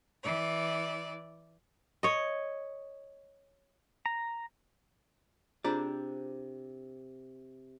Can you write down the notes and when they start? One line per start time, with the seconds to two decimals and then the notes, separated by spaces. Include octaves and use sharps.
0.23 E3 D5
2.03 C#5 D#5
4.06 A#5
5.64 C3 D4 F4 G#4 C5 D5 A#5